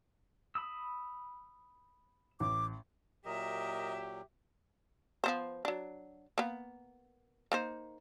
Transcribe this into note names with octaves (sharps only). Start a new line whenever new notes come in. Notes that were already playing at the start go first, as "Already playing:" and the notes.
B5 D#6 E6
A1 D6
A#2 F#3 G4 A#4 D#5 E5
F3 B3 C5
F#3 D4
A#3 B3
A#3 D#4 C5